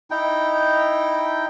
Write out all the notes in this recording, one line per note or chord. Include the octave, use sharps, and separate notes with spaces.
D#4 E4 G5